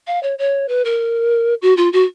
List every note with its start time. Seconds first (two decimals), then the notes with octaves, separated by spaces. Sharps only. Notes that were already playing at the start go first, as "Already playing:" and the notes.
0.07 F5
0.23 C#5
0.38 C#5
0.68 B4
0.85 A#4
1.62 F#4
1.77 F4
1.93 F#4